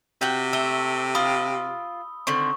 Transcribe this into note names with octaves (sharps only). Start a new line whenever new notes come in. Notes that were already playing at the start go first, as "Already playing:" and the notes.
C3 F#4 G5
A3 E6 G7
F4 B5 D#6
D3 D#3 C4 C#6